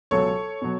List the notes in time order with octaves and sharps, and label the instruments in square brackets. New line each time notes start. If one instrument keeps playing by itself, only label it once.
[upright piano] C#2 B2 F#3 A4 C#5
B2 F#3